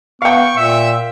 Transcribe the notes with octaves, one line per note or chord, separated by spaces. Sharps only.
B3 F5 G5 C#6
A#2 E5